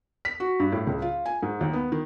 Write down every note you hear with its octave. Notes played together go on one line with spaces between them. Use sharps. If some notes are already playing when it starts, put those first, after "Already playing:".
B6
F#4
G2
A2
C#2
F4
G#5
G#2
D#2
B3
D#3